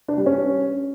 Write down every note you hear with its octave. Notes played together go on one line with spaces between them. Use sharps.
D4
G3
C#4